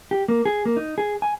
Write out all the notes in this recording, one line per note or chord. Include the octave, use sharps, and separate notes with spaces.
G4
A#3
G#4
A#3
D#4
G#4
G#5